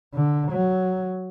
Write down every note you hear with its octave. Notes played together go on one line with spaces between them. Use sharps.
D3
F#3